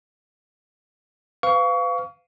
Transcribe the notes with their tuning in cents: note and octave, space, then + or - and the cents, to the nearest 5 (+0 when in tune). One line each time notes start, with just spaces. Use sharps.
B4 +35 F5 +0 C#6 +30